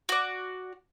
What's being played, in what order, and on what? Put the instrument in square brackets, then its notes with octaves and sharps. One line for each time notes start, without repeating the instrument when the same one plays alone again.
[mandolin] F#4 D5